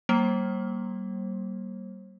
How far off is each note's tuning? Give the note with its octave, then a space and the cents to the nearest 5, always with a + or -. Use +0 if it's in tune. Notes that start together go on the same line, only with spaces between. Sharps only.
G3 -30 A#3 +5 C5 +35